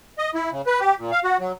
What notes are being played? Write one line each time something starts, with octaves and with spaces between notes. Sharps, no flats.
D#5
E4
C#3
B4
G4
A#2
F5
F#4
F#3